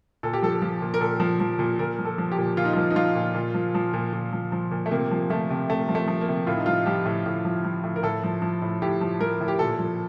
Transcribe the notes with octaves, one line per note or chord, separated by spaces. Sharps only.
A#2 A4
G4
F3 A4
F3
A#2
A#4
A#2 A4
F3
F3
A#2
A#2 A#4
F3
A4
F3
G4
A#2
A#2 F4
D#4
F4
F3
D#4
F3 F4
A#2
A#2
F3
F3
A#2
A#2
F3
F3
A#2
A3
C3 A#3
F3
F3 A3
C3
C3 A3
F3
A3
F3
A#3
C3
A2 F4
D#4
F3 F4
F3 G4
A2
A2
F3
F3
A2
A#4
A2 A4
F3
F3
A2
A2 G4
F3
F3 A#4
A2
G4
A#2 A4
F3